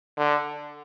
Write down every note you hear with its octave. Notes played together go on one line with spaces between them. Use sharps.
D3